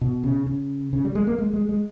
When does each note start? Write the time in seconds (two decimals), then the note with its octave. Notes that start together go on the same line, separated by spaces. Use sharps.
0.01 B2
0.23 C#3
0.46 C#3
0.93 C#3
1.05 G3
1.15 G#3
1.27 A#3
1.38 G#3
1.53 G#3
1.69 G#3